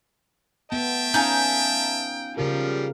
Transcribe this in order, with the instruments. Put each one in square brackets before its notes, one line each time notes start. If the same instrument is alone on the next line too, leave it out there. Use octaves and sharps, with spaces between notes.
[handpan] B3 [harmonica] E5 A5 [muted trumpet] G5
[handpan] C#4 [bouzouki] D#4 F4 G#5
[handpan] C#3 A#4 [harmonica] F3 G3 F5